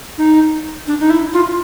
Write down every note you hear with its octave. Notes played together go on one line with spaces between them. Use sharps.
D#4
D4
D#4
E4
F4